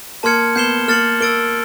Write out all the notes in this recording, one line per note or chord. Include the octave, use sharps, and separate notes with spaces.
A#3 A5 C6 F6 G#6 C#7
B3 G6 C7 E7 G7
A#3 F6 A6 C#7 F#7
A#3 E6 A6 D7 G7